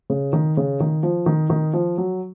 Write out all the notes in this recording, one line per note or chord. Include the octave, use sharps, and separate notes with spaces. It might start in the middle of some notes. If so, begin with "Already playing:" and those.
C#3
D#3
C#3
D#3
F3
D#3
D#3
F3
F#3